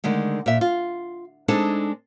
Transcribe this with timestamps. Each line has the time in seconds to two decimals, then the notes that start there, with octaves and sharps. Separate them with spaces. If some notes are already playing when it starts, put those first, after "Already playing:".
0.04 D3 D#3 G#3 A3
0.46 A#2 E5
0.61 F4
1.48 G#3 C4 D4 D#4 G#4 A4